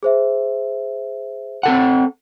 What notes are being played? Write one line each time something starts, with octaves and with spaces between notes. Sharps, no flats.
G#4 C5 E5
C4 A4 F#5